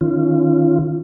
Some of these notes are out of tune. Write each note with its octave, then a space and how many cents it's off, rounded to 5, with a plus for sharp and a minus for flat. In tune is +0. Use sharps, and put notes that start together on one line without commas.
D#3 +0 C#4 +0 F4 -25